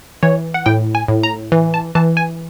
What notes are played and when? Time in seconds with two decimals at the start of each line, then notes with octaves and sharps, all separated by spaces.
0.23 E3 C#5
0.54 F#5
0.66 A2 G5
0.95 G#5
1.08 A2
1.23 A#5
1.52 E3
1.74 A5
1.95 E3 A5
2.17 G#5